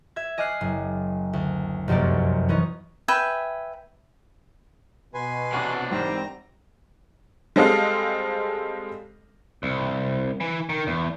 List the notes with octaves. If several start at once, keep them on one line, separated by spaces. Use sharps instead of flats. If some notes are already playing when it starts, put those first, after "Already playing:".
E5 G#6
D#5 G#5 D6 F6 F#6 C7
F#1
D2
F1 C2 F#2 A#3 D5
E3 B3 C#4 D#4
B4 E5 G5 G#5
B2 B4 G#5 C6
C3 D4 F#5 C#6 D6
G#1 E3 G3 C4 A#5
G3 G#3 C4 A4 D#5 F5
C2
E3
D#3
E2